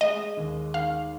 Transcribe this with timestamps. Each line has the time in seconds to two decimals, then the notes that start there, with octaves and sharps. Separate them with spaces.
0.01 G#3 D#5
0.37 D#2
0.74 D#3 F5